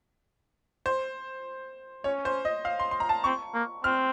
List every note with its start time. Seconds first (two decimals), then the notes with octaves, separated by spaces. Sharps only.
0.86 C5
2.04 C#4 C#5
2.25 C5
2.45 D#5
2.65 F5
2.80 C6
2.91 C6
3.00 A#5
3.09 A5
3.24 C4 C#6
3.54 A#3
3.84 C4 F6